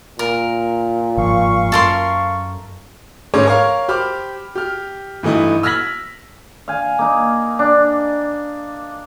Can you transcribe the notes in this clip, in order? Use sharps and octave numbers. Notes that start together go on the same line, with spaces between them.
A#2 A#4
G1 G#2 F3 F5 C#6
F#2 A4 A#4 C6
G#2 G#3 A3 C#4 C#5 D6
A#4 C#5 F5
G4 C5 B5 D6 F6
G4 F6
G2 E3 A3 D#4 E4
E6 F6 G#6 A#6 B6 F#7
F5 G#5
A#3 D#4
D4